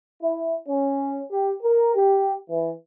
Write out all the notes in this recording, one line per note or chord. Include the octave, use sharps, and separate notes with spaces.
E4
C#4
G4
A#4
G4
E3